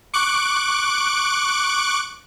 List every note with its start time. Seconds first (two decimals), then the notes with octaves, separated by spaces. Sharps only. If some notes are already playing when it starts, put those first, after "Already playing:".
0.14 C#6 D6 F#6 D7